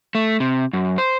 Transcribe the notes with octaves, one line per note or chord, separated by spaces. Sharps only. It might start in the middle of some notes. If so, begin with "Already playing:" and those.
A3
C3
F#2
C5